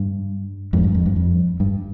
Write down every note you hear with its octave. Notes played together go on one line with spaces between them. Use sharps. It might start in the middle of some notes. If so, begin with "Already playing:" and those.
Already playing: G2
F2 G#2
G2
F2
G2
F2
G2